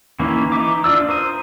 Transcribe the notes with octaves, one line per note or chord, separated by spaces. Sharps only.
D#3 E3 A#3 C#4 E4
E3 D#4 E5 D6
D4 F4 D5 E6
A#4 C5 D#6